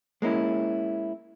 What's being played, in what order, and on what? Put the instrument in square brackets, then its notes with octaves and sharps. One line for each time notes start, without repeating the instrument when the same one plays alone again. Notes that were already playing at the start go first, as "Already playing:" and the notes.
[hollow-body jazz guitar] G#3 A#3 C#4 E4